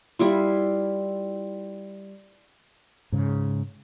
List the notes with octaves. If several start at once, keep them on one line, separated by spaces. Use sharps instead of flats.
G3 E4 F4
G#2 C#3